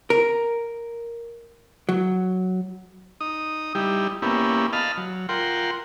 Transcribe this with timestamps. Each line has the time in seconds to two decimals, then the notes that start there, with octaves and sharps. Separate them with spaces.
0.10 A#4
1.89 F#3
3.21 D#4 D#6
3.75 G3 D#4 E4 G4
4.22 A#3 B3 C#4 E4 G4
4.73 D#5 F5 A5 B5 F6
4.97 F#3
5.29 F4 A#4 F#5 G5 C6